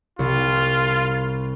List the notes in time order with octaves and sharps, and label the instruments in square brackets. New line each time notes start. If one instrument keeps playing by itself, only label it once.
[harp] C2 [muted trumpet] F4